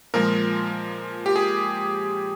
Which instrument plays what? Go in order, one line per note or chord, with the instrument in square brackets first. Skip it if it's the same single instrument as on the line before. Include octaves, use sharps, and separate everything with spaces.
[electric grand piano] A#2 F3 G#3 A#4
G4
G#4